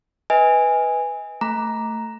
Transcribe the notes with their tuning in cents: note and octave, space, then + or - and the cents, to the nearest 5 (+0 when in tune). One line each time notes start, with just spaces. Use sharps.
B4 +0 D#5 +40 G#5 -10
A3 +10 A#5 +5